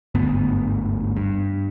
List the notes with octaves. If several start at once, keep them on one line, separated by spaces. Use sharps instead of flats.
G1 D2 G#2 B3
G2